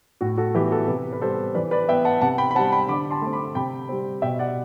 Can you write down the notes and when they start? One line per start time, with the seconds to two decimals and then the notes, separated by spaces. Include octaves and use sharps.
0.21 A2 F#4
0.38 F#4 A4
0.55 E3 B3 E4 G4
0.71 F#4 A4
0.88 C3 G4 B4
1.13 B4
1.21 G3 B3 A4 C5
1.54 E3 B4 D5
1.71 B4 D5
1.89 B3 E5 G5
2.05 F#5 A5
2.21 C3 F#5 A5
2.38 G5 B5
2.51 B5
2.55 C4 F#5 A5
2.59 G3
2.72 G5 B5
2.88 D3 B5 D6
3.11 A5 C6
3.22 A3 C4
3.33 B5 D6
3.55 C3 G5 B5
3.89 G3 C4
4.22 B2 E5 G5
4.39 D5 F#5